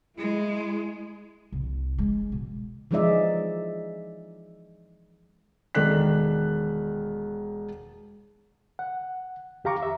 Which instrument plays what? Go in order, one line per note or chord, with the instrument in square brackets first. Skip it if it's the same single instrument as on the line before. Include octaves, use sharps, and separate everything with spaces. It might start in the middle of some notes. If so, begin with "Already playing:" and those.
[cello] G#3 [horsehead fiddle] E4
[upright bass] C2
G#3
B2
[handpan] E3 F3 G#3 D#4 D5 E5
[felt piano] E1 D#3 A4 D5 F#6 B6
[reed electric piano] F#5
E2 G4 F5 A#5 C#6 D6
E5